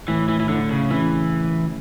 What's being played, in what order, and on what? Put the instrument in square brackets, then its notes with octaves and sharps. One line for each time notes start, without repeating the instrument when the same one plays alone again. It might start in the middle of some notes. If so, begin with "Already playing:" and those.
[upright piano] A2 [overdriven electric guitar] E3
[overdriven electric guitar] E3
E3
[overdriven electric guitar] D3 [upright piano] E4
[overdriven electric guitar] C#3
[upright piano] C#3 [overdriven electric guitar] E3